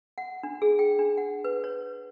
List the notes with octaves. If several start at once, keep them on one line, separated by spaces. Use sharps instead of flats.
F#5
D4
G#4
G5
D4
F#5
B4
C#5